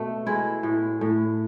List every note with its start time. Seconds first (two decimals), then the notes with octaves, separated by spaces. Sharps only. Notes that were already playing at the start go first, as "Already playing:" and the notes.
Already playing: B2 A3
0.27 G#3 E4
0.63 A2
1.01 A2